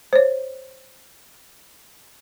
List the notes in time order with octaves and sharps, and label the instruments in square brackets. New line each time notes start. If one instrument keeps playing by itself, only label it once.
[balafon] C5 C#5